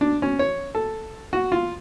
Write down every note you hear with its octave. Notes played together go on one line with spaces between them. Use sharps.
D4
C#4
C#5
A4
F#4
F4